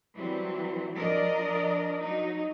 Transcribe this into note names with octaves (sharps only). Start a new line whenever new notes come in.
E3 F#3 G3 C4
F3 D4 A#4 D5 D#5
F#3 D#4